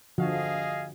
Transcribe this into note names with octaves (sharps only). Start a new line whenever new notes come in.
D3 F3 F#4 G#4 D#5 F5